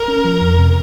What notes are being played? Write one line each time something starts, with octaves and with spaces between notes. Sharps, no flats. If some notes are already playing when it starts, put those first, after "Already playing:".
Already playing: A#4
C#4
F3
F2
C3